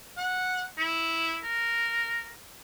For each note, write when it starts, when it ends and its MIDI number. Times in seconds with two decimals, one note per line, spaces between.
0.17 0.64 78
0.78 1.38 64
1.44 2.31 70